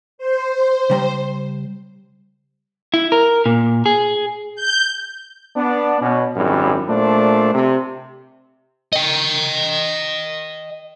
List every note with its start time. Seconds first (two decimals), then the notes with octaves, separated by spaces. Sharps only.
0.18 C5
0.90 C#3 G3 A#5
2.94 E4
3.12 A#4
3.46 A#2
3.86 G#4
4.56 G6
5.57 B3 D4
6.01 B2 C#4
6.36 G#1 F#2 G3 E4
6.89 A#2 A3 D4 C5
7.54 C3
8.93 D#5 G5